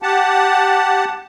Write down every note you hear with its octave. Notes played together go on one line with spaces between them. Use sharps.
G4 F#5 A5